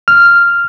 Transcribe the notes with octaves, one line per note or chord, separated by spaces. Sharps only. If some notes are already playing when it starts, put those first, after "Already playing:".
F6